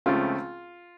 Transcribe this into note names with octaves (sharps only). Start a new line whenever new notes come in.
C#2 C#3 F3 A3 C4 F4